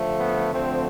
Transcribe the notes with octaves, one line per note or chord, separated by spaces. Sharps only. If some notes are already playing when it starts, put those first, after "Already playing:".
Already playing: D3 F3 A3
B3
D3 F3 A3 C4